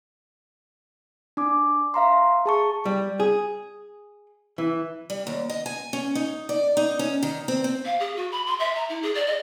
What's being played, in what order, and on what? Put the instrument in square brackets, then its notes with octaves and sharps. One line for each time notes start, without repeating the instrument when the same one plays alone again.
[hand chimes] D4 D6
E5 F5 A#5 C6
G#4 A5 C#6
[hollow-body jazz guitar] G3
G#4
E3
[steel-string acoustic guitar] G3
D#2
D#5
G#5
C#4
D#4
D5
D#4
C#4
D#3
C4
C4
[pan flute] F5
G#4
F#4
B5
C6
E5
A#5
E4
G#4
D5
D#5